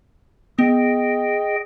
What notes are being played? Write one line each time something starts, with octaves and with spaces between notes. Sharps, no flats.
B3 G#4 D#5 G5